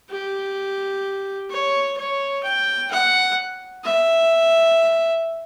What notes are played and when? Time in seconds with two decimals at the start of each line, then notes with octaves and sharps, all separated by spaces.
0.10 G4
1.50 C#5
1.97 C#5
2.43 G5
2.91 F#5
3.84 E5